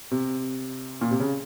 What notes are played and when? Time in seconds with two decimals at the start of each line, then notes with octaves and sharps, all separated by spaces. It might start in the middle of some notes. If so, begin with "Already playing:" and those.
0.11 C3
1.01 A#2
1.11 C3
1.20 C#3